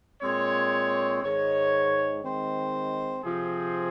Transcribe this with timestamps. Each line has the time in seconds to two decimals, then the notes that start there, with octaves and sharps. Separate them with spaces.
0.21 A#2 G#3 C4 C#5
1.22 G#2 D#3 G#3 C#5
2.23 D#3 G#3 C4 C5
3.24 C3 F3 C4 G#4